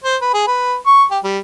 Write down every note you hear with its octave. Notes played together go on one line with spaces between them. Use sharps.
C5
B4
G#4
B4
C#6
G4
G3